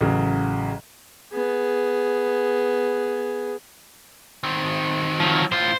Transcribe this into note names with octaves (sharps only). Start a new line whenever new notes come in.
A1 C#3 F#3
B3 G#4
D#3 C4
F3 F#3
A2 F4 C5